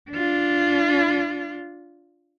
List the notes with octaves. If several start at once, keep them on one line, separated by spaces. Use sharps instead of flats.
D4 F4